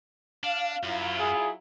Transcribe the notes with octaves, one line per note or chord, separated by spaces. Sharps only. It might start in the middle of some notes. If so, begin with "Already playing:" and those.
D4 F5
F#2 F#3 E4 F4
G#4